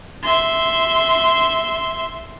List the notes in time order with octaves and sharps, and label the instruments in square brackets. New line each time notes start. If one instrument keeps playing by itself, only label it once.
[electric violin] E5 C6